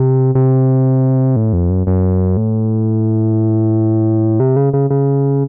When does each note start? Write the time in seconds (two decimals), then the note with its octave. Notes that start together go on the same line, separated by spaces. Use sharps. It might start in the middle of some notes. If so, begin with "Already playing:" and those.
Already playing: C3
0.35 C3
1.36 A2
1.53 F2
1.70 F#2
1.87 F#2
2.37 A2
4.40 C3
4.56 C#3
4.73 C#3
4.90 C#3